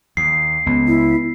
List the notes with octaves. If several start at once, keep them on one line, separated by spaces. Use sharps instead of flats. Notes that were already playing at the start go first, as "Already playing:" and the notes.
D#2 C7
C#2 B3
E4